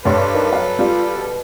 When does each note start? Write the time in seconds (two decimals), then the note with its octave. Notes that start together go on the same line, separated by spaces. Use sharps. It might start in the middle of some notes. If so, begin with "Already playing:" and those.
0.05 G2 A4 B4 C#5 C6
0.34 D#3
0.53 F#3 F5
0.79 G3 F4
1.16 B2